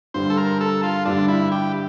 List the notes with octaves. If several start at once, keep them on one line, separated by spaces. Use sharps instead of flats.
G2 D3 G3 C5
A4
A#4
A4
F4
G2 D3 G3 D4
E4
G4